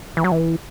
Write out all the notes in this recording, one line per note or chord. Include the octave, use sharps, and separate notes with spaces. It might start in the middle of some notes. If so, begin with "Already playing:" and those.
E3
F#3
E3